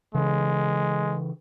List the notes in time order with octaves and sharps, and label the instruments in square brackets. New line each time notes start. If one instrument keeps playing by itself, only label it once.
[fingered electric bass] C#3 E3 [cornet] G#3